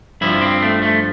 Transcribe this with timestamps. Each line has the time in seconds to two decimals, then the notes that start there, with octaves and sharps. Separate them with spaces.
0.21 G2 F3 E4
0.41 C4
0.62 A3
0.82 A3